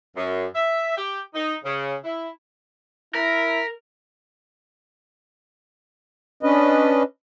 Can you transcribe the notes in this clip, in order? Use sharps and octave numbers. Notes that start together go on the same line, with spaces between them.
F#2
E5
G4
D#4
C#3
E4
E4 A#4 B6
C#4 D4 B4 D#5